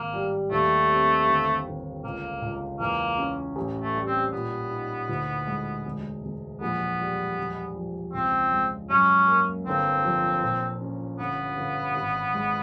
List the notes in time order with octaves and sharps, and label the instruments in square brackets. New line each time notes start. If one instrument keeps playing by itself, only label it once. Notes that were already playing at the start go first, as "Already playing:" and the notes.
Already playing: [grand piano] G#1 [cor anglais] A#3
[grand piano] G3
[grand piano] D#2 [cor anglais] A3
[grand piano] C4
G1
G1
[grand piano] C#2 [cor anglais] A#3
[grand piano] C#2
[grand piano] E2 [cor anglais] A#3
[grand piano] C#4
A1
[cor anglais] A3
[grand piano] G3
[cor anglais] C4
[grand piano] A#2 [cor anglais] B3
[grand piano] D#4
D2
G#3
E1
E1
[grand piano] A#1 [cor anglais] B3
[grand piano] G3
E1
F3
[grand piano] C#2 [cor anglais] C4
[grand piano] G#3
[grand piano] F#2 [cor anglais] C#4
[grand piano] A#3
[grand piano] G1 [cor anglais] C4
[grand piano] F3
A#2
C#4
[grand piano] G1 [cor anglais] B3
[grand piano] G1
G#1
G#3